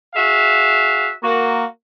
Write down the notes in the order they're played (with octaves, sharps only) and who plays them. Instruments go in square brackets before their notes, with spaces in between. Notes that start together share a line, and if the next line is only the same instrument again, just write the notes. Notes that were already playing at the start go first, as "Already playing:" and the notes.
[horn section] F#4 G#4 E5 F5
A#3 F#4